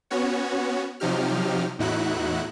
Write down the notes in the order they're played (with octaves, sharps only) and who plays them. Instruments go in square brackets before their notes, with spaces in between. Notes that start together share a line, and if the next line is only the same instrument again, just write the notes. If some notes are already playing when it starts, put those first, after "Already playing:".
[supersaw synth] B3 C#4 F#4 C#5
C3 F3 F#3 D#4 G4 F6
E2 A2 D#4 E4 F#4 F#6